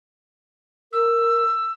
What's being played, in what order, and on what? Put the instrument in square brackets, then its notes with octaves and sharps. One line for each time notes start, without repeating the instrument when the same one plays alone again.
[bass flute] A#4 [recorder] E6